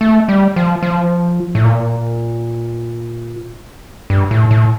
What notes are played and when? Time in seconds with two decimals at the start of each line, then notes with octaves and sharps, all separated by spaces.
0.01 A3
0.29 G3
0.56 F3
0.83 F3
1.55 A2
1.64 A#2
4.10 G2
4.31 A2
4.51 A2